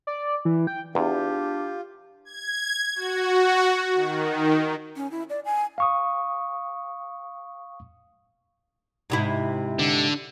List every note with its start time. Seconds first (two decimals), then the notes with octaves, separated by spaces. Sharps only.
0.07 D5
0.45 E3
0.67 G5
0.95 E2 D4 F4 G4
2.25 G#6
2.95 F#4
3.94 D#3
4.96 C#4
5.11 E4
5.30 D5
5.45 G#5
5.78 F5 C#6 D#6
9.10 G#2 C3 E4
9.79 D3